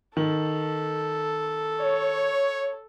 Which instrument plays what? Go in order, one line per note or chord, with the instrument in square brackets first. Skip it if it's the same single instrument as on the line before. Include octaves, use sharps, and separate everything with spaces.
[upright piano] D#3 [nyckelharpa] A4
[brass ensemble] C#5